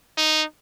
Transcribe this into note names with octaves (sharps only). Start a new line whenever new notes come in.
D#4